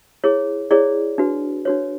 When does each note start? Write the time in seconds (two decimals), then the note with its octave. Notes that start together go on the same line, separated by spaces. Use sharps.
0.24 E4 G#4 C#5
0.71 E4 G#4 C#5 D5
1.18 D4 F#4 B4
1.65 D4 F#4 B4 C#5